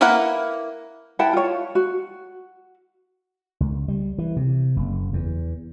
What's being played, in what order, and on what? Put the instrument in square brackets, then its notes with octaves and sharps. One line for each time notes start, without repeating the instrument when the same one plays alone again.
[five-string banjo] A#3 E4 A#4 B4 F#5
[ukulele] E4 F#5 G5 A5
F4 C#5
F#4
[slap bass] C#2
G3
E3
C3
F#1
E2